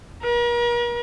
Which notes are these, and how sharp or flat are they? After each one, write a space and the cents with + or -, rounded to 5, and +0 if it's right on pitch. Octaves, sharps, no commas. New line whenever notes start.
A#4 +45